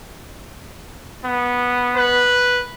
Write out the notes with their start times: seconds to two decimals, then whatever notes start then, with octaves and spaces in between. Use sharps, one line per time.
1.25 B3
1.96 B4